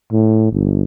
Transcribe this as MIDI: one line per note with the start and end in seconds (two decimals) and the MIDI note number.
0.12 0.50 45
0.52 0.84 31